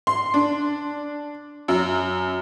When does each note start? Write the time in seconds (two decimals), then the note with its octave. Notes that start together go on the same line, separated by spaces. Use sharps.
0.07 C6
0.34 D4
1.68 F#2